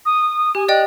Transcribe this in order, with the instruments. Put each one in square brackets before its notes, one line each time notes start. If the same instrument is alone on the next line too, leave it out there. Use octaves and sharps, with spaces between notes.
[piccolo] D#6
[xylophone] G4 [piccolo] G#5
[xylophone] D5 D#5 G5 [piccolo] F#6